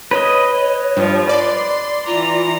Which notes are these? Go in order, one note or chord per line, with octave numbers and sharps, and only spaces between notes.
B4 C#5 D#5
G2 F3
D5 C6
E3 F4 A#5